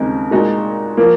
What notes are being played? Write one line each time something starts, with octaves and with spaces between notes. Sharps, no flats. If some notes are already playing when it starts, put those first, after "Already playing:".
Already playing: D#2 C#3 G#3 C4 D#4
A#2 G#3 D#4 F#4
F3 A#3